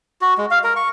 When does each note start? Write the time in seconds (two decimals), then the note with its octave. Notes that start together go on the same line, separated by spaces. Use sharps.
0.21 F#4
0.38 G#3
0.51 F5
0.64 A#4
0.76 C#6